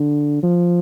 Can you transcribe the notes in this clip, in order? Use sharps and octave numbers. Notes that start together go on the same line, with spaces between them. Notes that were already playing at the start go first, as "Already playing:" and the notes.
Already playing: D3
F3